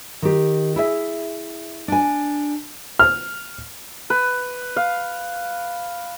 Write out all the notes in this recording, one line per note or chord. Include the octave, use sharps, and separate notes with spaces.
D#3 G4
E4 G#4 E5
D4 G#5
F6
B4
F5